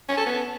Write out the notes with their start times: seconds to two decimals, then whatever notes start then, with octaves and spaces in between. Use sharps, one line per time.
0.09 C#4
0.17 A4
0.26 B3